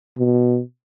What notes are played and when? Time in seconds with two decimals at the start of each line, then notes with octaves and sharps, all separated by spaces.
0.18 B2